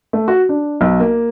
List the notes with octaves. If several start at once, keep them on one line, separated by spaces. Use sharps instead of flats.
A3
F#4
D4
B1
A#3